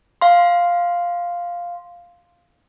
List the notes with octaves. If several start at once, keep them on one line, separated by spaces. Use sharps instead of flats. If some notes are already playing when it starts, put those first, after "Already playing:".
F5 C6